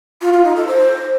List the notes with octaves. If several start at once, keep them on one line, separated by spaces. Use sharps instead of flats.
F4
F4
D#4
A4
C5